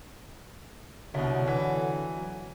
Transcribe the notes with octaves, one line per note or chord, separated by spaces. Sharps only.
C2 B2 D3 F#3
E3
F#3